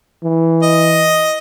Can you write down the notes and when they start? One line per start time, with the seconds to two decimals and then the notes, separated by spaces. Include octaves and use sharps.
0.24 E3
0.62 D#5